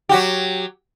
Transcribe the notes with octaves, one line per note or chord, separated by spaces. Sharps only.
F#3 F#4 G4